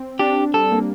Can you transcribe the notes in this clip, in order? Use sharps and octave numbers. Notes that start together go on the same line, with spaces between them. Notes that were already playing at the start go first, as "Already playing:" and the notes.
Already playing: C4
D4 G4
G3 A4
A#3